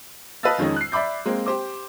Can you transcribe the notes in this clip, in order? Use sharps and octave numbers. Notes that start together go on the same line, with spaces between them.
B4 D#5 F5 A5 E6 A6
F2 D#3 G#3 C#4 D#4
F#6 C7
D5 E5 B5 D6 G6
G#3 A#3 C4
G4 C5 D6